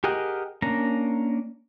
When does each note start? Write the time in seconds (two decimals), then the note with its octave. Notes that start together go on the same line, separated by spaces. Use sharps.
0.04 G4 G#4 A#4 D#5 F#5
0.62 A#3 C#4 D4 A#5